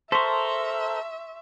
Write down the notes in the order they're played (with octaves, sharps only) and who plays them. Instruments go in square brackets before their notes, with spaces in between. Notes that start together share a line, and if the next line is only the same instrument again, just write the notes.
[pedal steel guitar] A4 A#4 [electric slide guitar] C5 [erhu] E5 [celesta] C6 C#6 B6